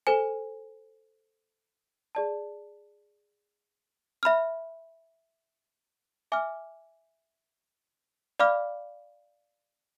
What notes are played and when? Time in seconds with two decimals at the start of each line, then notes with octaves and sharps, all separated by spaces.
0.07 A4 C5 G#5
2.15 G#4 D5 A5
4.23 E5 B5 F6
6.32 E5 G#5 D6 F6
8.39 D5 F5 B5 D6 F6